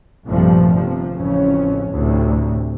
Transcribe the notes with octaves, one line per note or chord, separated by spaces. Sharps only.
A#1 G2 C3 F3 G3 A3
G1 C3 F3
A1 F2 C#3 C#4
D2 A2 C3